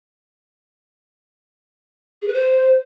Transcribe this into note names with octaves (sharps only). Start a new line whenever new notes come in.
G#4
B4
C5